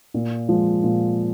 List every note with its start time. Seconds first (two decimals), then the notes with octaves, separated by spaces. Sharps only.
0.14 A#2
0.49 F3 G#3
0.84 A#2